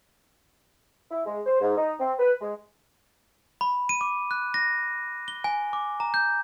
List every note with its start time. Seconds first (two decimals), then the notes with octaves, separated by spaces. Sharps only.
1.11 E4
1.26 G#3
1.46 C5
1.61 G#2
1.77 D#4
1.99 C4
2.18 B4
2.41 G#3
3.61 B5
3.89 D#7
4.01 D6
4.31 F#6
4.54 A#6
5.28 G7
5.44 G#5
5.73 D6
6.00 A#5
6.14 G6